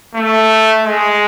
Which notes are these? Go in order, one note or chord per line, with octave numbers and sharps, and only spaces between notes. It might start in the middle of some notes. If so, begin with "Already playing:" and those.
A3
G#3